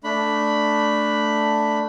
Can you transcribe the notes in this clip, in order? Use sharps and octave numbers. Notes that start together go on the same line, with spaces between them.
A3 D4 B5